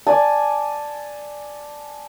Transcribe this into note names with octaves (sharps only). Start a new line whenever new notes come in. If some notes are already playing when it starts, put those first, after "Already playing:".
D5 G#5 A5